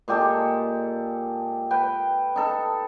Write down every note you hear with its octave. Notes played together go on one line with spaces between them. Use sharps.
A#2 G#3 G4 A4
B4 G5
D#4 A4